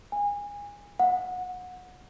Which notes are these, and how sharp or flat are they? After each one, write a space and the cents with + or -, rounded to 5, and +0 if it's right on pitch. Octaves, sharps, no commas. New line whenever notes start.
G#5 -25
F#5 -20